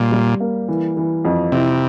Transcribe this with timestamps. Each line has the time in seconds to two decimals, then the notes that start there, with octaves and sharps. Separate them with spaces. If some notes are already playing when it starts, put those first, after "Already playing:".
Already playing: A#2 G3
0.12 G3
0.40 A#3
0.68 E3
0.97 E3
1.25 F2
1.52 C3 E4